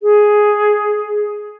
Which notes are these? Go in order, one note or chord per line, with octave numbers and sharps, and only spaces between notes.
G#4